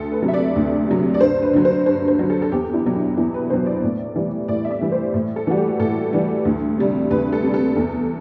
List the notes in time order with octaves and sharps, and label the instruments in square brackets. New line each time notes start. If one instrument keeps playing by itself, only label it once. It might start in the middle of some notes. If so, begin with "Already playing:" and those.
Already playing: [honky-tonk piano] D2 A4
B4
C3 F#3
E5
D5
D2
C3 F#3
D5
G2 C5
B4
D3 F#3
C5
G2 C5
C5
D3 F#3
A4
A4
E2 G4
E4
B2 F#3
D4
E2 E4
B4
B2 F#3 C5
D5
A2
E3 G3
A2 D5
E5
D5
E3 G3
C5
A2
A4
E3 G3 F#4
G4
A2 A4
E3 G3
D2
C3 G3
D2 B4
A4
C3 G3
A4
E2